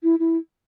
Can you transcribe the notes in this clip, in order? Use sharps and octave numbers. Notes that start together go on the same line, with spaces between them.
E4
E4